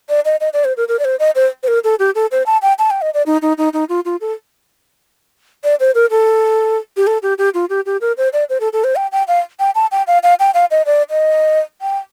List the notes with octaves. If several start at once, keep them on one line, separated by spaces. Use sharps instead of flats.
D5
D#5
D#5
D5
C5
A#4
A#4
D5
C5
D#5
C5
C5
A#4
A4
G4
A4
C5
A5
G5
A5
G5
D#5
D5
D#4
D#4
D#4
D#4
F4
F4
A4
D5
C5
A#4
A4
G4
A4
G4
G4
F4
G4
G4
A#4
C5
D5
C5
A4
A4
C5
G5
G5
F5
G5
A5
G5
F5
F5
G5
F5
D#5
D5
D#5
G5